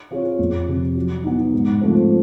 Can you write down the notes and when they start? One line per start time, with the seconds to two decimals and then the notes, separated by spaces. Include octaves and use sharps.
0.11 C4 F4 G#4 C#5
0.39 F2
0.67 C3 F3
0.96 F#3
1.24 B3 D#4
1.54 G#2
1.81 F3 A3 C4